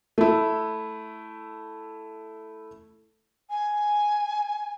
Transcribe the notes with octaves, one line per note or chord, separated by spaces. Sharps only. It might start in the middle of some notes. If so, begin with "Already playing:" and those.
A3 E4
G#5